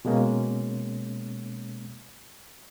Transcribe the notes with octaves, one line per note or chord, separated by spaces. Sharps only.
B2 G#3 A#3 C#4